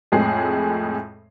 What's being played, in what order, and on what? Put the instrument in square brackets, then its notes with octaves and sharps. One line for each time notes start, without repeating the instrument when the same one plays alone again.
[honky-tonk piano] F2 A2 G#3 G#4 C7